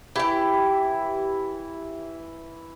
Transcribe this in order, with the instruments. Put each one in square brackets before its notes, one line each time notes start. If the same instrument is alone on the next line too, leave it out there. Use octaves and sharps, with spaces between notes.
[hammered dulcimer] E3 E4 [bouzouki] G4 G5